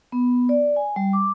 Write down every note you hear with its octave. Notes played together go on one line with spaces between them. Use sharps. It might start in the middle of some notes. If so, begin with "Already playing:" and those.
B3
D5
G#5
G3
D6